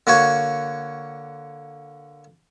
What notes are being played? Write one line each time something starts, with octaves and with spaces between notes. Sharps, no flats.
D3 A#3 F#4 C#5